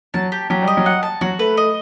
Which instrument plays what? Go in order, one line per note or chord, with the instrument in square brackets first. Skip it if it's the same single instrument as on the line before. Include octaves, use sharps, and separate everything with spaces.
[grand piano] F#3 [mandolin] A5
[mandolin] G4
[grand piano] F#3 [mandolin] G4
[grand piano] G3 [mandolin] D#5
[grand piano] F#3
[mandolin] F#5
A5
[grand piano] F#3 [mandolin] F#4
[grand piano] A3 [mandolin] B4
[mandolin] D#5